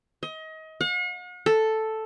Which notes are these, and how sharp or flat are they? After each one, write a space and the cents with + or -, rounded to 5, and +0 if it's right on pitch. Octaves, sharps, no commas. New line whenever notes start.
D#5 +30
F#5 -45
A4 +0